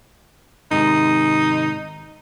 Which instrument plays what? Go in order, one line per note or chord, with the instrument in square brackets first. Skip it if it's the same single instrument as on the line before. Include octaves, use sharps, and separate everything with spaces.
[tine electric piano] G#2 C3 D#3 [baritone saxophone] D#4